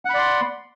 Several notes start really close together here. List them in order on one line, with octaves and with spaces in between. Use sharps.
F#5 B5 D5 C6